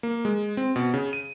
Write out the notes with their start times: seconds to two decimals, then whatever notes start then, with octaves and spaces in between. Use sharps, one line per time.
0.03 A#3
0.25 G#3
0.57 C4
0.76 B2
0.94 C#3
1.13 D#7